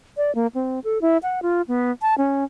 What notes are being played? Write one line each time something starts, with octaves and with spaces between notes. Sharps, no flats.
D5
A#3
C4
A4
E4
F#5
F4
B3
A5
C#4